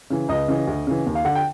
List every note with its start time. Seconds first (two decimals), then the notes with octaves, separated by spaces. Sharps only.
0.10 C#3 E3
0.28 C#2 D#5
0.48 C#3 E3
0.67 D2
0.87 C#3 E3
1.06 D#2
1.15 F5
1.25 D3 F#5
1.35 G5